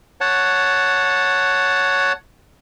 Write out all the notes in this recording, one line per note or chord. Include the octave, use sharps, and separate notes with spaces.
C#5 F#5 A5